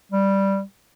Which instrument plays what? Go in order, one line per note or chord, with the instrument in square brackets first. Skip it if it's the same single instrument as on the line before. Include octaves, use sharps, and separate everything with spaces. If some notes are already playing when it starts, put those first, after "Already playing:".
[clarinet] G3